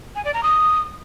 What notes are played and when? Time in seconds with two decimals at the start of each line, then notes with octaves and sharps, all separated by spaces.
0.16 G#5
0.25 D5
0.34 A#5
0.43 D#6